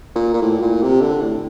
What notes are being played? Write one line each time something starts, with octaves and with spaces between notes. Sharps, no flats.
A#2
A#2
A2
A#2
C3
D3
A2